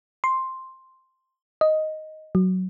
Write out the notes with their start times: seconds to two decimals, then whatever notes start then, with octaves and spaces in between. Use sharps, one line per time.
0.24 C6
1.61 D#5
2.35 F#3